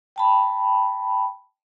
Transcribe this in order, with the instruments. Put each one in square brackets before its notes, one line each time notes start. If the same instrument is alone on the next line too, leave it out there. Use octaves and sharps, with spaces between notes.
[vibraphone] G5 A5 B5